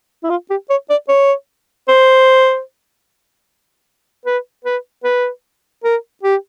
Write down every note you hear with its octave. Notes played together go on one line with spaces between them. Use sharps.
E4
F4
G4
C#5
D5
C#5
C5
B4
B4
B4
A#4
G4